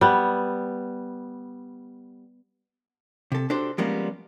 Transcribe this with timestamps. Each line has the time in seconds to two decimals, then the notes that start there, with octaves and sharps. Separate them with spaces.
0.01 G3 B3
3.32 C3 A4
3.50 D4 F#4 G4 A4 C5
3.78 F3 G3 G#3 A#3 B3 C#4